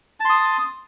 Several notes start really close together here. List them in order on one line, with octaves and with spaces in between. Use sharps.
A5 C6 D#6